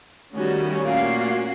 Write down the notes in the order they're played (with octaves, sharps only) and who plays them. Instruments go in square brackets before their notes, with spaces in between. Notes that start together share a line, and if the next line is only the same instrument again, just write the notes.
[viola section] D#3 G3 F#4 [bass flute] A3 [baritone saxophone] C#4
[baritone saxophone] A#2 [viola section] C#4 F#4 [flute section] F5